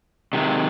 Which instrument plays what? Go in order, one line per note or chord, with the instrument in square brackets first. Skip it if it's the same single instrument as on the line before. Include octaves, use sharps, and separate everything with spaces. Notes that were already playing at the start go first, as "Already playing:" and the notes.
[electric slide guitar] C3 D#3 G#3